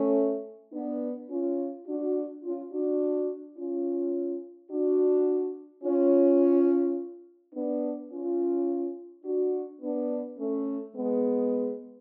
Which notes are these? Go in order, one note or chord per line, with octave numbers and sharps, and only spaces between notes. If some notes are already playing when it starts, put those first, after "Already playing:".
Already playing: A3 C#4
B3 D4
C#4 F4
D4 F#4
C#4 F4
D4 F#4
C#4 F4
D4 F#4
C#4 F4
B3 D4
C#4 F4
D4 F#4
B3 D4
A3 C#4
G#3 B3